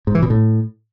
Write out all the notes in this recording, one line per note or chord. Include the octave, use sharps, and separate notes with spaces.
G#2
E3
B2
A2